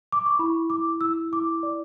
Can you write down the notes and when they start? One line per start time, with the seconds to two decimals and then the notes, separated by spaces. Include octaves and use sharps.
0.12 D6
0.26 C#6
0.39 E4 B5
0.70 E4 D6
1.01 E4 E6
1.32 E4 D6
1.63 D5